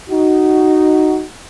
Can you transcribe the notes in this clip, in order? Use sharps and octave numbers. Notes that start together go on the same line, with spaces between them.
D#4 F#4